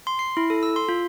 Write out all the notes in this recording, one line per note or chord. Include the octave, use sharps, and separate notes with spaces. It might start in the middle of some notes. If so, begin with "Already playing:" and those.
C6
C7
E4
A4
E6
C6
F4